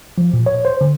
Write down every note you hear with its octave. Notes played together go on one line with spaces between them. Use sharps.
F3
A#2
C#5
C5
D3